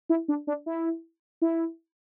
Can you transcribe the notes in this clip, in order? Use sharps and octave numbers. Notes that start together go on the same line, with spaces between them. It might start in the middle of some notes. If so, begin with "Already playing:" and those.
E4
D4
D4
E4
E4